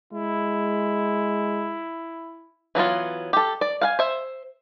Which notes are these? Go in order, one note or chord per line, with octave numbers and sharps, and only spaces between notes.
G#3 E4
E3 F#3 B3 F4
G4 A4
D5
F5 F#5 G#5
C5 E5